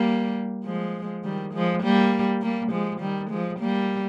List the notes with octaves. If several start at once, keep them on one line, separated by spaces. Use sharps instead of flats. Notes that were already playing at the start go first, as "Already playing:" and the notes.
Already playing: G3 A#3
F3 G#3
D#3 G3
F3 G#3
G3 A#3
G3 A#3
F3 G#3
D#3 G3
F3 G#3
G3 A#3